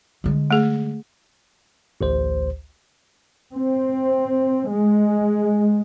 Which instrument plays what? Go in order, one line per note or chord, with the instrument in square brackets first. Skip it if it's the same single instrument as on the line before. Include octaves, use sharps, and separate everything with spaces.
[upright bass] D3 G#3
[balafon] A3 G#4
[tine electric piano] A1 D2 C5
[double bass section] C4
G#3